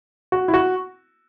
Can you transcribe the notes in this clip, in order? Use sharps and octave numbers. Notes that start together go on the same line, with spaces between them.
F#4
E4
F#4